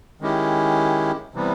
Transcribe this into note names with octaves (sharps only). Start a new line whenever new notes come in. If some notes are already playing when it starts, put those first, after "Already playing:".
D#3 G#3 C#4 E4 G4
C3 E3 G3 B3